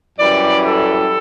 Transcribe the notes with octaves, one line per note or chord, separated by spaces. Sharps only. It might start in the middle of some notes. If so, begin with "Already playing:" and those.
F#2 E3 G3 D5
A4